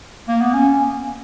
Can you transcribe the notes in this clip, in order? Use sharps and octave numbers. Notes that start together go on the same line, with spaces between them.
A#3
B3
C#4